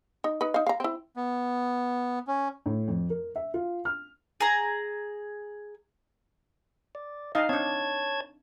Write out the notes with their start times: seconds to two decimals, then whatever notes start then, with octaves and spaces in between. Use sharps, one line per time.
0.24 D#4
0.41 D#4 B4
0.54 D#4 F5
0.67 F5 A#5
0.80 C4 E4
1.16 B3
2.27 C#4
2.66 A2
2.88 F2
3.10 A#4
3.36 E5
3.54 F4
3.85 F6
4.41 G#4 A#5
6.95 D5
7.35 D#4 D#5 F5
7.49 C4 D4 C#5 A5 G#6